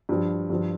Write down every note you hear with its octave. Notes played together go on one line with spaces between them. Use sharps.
G2 F3
G2 F3